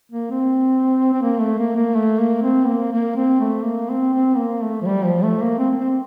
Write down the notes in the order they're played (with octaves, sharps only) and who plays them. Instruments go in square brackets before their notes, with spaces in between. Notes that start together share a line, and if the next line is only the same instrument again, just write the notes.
[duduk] A#3
C4
C4
A#3
A3
A#3
A#3
A3
A#3
C4
A#3
A#3
C4
A3
A#3
C4
C4
A#3
A3
F3
G3
F3
A3
A#3
C4
C4